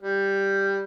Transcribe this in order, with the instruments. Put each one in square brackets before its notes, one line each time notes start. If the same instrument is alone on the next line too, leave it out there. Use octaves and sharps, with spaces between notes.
[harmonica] G3